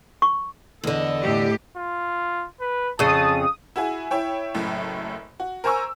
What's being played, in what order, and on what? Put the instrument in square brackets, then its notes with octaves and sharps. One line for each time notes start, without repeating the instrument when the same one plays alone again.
[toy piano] C#6
[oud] E2 D3 [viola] A4 D#5
[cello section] A2 G4
[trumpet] F4
B4
[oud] F2 C#3 [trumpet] A5 [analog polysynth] D#6
[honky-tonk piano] E4 F#4 G#4 G#5
E4 C#5 G5
F#1 F#2 A2
F#4
A#4 C5 G#5 A#5 C#6 E6